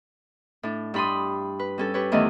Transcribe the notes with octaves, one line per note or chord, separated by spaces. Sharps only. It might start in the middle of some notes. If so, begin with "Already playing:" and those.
A2 D4
G2 D4 B5 C6 D#6
B4
G3 C#4 A4
G4 B4 C#5
E2 D#3 E3 A3 D4 D#5